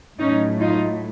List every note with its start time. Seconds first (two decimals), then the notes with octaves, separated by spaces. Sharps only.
0.19 A2 F#3 A3 C#4 D#4
0.60 D#4 F4